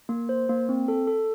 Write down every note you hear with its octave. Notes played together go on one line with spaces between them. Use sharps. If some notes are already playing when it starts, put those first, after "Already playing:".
A#3
C5
A#3
C4
A4
A4